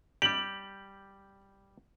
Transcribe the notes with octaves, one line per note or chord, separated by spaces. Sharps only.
G3 G4 F#7